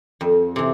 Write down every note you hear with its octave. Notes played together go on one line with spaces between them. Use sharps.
F2
C3 E3